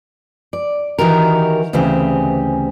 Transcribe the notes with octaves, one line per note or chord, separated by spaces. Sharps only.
D5
D#3 E3 D#4 F#4 G4 A#4
D2 C#3 E3 C4 G4 G#4